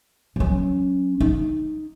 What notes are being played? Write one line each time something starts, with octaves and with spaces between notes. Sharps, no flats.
F#3 C#4
D#4